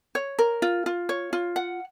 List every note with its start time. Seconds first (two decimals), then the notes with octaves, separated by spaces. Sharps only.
0.15 C#5
0.39 A#4
0.62 F4
0.86 F4
1.09 C#5
1.33 F4
1.56 F#5